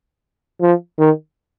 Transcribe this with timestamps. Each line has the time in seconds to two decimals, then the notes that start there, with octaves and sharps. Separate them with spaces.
0.61 F3
0.98 D#3